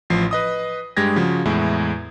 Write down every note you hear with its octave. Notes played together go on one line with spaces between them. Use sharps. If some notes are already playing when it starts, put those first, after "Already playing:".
A1 F3 C7
B4 D#5 D#6
G2 G#3 G4 G#6 A#6
C#3 F3 F#4
E2 A2 G#3 E4